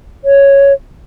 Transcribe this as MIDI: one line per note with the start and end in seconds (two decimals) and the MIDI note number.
0.25 0.73 73